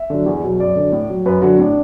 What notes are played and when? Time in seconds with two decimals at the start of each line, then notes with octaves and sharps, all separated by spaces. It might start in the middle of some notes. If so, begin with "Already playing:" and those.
Already playing: E5
0.10 D3 F#3
0.26 E2
0.44 B2 F#3
0.60 F#2 D5
0.76 D3 F#3
0.92 A2
1.10 F#3
1.26 F#2 B4
1.42 D3 F#3 F#4
1.58 A2 D4